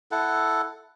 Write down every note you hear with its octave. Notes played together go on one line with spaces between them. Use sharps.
E4 A4 F#5